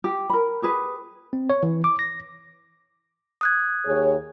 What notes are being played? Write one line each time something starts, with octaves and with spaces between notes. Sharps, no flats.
G4
A#4 B5
G4 G#4 B4
C4
C#5
E3
D6
A#6
D#6 F#6 G#6
D#2 G#4 C#5